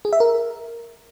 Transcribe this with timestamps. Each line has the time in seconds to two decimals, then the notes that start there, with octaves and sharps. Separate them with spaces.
0.05 G#4
0.13 E5
0.20 A#4